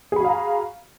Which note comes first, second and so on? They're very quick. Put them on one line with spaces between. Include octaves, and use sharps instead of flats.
G#4 B5 F#4 F5 A#5